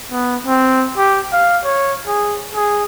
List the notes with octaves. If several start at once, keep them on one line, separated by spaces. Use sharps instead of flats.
B3
C4
G4
F5
C#5
G#4
G#4